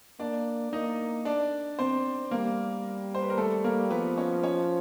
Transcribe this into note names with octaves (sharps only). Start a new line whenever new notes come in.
A#3 D4 D5
A#3 D#4 D#5
D4 D5
C4 C5
G3 A#3 A#4
C5
B4
A#4
A3 A4
A#3 A#4
F3 B3 B4
C#4 C#5
C#4 C#5